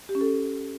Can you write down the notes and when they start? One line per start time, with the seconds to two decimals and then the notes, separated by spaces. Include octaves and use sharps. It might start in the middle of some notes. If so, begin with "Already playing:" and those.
0.09 G4
0.15 C#4
0.21 A4